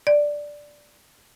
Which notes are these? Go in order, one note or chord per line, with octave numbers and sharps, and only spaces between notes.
D5